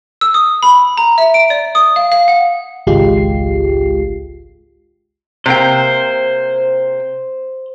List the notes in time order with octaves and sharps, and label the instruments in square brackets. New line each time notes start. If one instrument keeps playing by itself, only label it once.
[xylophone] E6
D#6
B5
A#5
E5
D7
D5
D#6
F5
F5
F#5
[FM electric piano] G#1 C#2 G#3 F4 G4 C7
[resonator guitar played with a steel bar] C3 A#3 G5 [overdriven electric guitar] C5